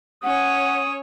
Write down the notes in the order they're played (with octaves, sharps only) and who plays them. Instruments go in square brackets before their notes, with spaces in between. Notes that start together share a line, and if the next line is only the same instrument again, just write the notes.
[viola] C#4 C#5 [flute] F#5 [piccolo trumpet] D#6